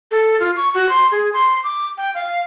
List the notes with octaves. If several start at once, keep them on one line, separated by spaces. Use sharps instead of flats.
A4
F4
C#6
F#4
C6
G#4
C6
D6
G5
F5